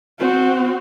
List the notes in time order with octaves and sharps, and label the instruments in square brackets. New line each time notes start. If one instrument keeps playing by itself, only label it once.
[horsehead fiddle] C4 F#4